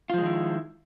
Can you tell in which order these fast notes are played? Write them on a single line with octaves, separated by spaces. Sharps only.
F4 F3 G#3 D#3 E4